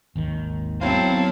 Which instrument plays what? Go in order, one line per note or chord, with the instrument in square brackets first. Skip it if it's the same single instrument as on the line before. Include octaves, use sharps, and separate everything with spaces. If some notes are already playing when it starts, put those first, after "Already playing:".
[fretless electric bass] G#1 D#2 D#3
[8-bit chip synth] F#3 E4 F5 [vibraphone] B3 C#5 [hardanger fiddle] C4 A4